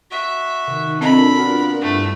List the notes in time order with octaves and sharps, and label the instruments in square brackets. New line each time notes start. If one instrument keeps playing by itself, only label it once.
[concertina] F#4 [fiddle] E5
[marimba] C3 [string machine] D#3
[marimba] C4 D#5 [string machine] D4 F4 A#4 [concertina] A4 [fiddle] B5
[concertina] B3 [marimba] F#4
[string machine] G2 E4 E6 [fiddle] A3